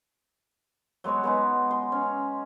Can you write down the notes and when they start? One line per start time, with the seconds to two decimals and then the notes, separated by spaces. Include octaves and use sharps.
1.04 F#3 G#3 B3 C#5
1.23 G#3 B3 D#4
1.71 C6
1.92 C#4